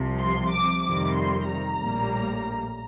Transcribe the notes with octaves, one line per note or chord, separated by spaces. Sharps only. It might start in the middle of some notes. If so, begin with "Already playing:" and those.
Already playing: C2 C3 F3
C6
D6
F2 C3 D#3 G3 D6
C6
A#5
A#1 A2 G3 A#3